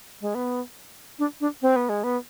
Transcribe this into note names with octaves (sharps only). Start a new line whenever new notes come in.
G#3
B3
D4
D4
C4
B3
G#3
B3